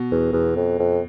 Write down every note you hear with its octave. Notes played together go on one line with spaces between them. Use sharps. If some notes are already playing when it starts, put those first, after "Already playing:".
Already playing: B2
E2
E2
F2
F2